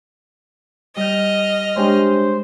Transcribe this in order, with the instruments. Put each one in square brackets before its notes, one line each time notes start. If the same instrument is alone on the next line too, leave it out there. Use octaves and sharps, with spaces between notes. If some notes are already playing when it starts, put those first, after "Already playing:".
[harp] G3 G6 [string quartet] D#5 F6
[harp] G#3 [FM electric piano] D4 G4 C#5 [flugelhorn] C5